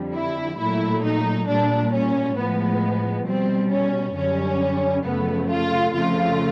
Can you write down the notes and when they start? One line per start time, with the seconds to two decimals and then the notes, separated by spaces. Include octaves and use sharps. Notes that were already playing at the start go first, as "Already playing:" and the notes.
Already playing: F2 D3 G3
0.15 E4
0.60 A#2 F#3 A3 E4
1.04 D#4
1.49 A#2 G3 D4
1.94 C#4
2.38 A2 F3 G#3 B3
3.27 B2 G3 C4
3.72 C#4
4.16 F#2 D3 G3 C#4
5.06 F#2 C#3 F3 A3 B3
5.51 F4
5.95 F2 C#3 F3 A3 F4